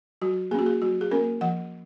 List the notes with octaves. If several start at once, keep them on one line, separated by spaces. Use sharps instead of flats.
F#3 F#4
A#3 C#4 F#4 G#4
G#4
F#3 F#4
G#4
A#3 C#4 A#4
F3 F#5